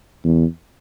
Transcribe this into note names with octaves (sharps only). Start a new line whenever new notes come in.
E2